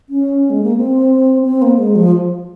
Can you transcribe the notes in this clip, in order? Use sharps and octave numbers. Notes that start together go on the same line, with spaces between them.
C#4
G#3
A#3
C4
C4
A#3
G#3
F3